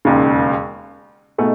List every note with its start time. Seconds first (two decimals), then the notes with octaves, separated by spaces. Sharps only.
0.05 E1 D#2 C#3
1.38 B2 A3 D#4 G#4